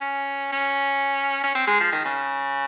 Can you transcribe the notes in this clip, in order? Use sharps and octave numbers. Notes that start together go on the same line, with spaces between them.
C#4
C#4
C#4
C4
G#3
F3
D#3
C#3